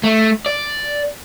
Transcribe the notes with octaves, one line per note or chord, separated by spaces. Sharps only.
A3
D5